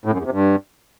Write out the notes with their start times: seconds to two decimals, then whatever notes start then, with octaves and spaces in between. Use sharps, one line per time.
0.05 A2
0.12 F#2
0.19 E2
0.25 C3
0.32 G2